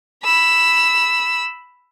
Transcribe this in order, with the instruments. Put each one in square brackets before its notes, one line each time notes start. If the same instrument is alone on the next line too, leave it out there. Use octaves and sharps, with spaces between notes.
[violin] B5 E6